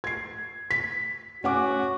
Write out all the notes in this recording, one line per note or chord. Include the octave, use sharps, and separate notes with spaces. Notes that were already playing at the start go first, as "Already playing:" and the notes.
G#6 C7
B6
C#4 F#4 F#5 D6